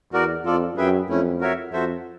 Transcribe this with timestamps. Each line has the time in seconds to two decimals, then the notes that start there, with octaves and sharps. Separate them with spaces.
0.13 E2 F#4 A#4 D5
0.45 F2 F4 A4 D5
0.77 F#2 G#4 B4 E5 G5
1.09 F2 A3 C#4 E4
1.41 F#4 A#4 C#5 E5
1.73 F2 F#4 A4 C5 E5